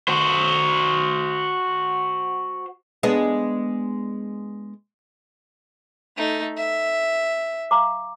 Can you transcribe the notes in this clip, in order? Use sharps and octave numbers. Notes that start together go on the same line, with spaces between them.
F#4 C5
G#3 B3 D4
A3 D#4
E5
F5 A#5 D6